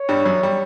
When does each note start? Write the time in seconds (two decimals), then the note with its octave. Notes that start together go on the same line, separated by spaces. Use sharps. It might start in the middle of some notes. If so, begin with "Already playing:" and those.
Already playing: C#5
0.09 G2 G3
0.25 F#2 F#3
0.43 G3